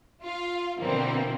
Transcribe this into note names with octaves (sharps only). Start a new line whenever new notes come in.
F4 F5
B2 D3 E3 A#3 C4